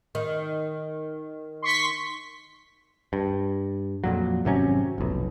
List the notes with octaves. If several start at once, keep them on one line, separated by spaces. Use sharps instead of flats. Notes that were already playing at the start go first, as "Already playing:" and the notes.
D#3
C6 C#6 B6
G2
F2 A#2 F#3
G#1 C3 F#3 C#4
F1 B1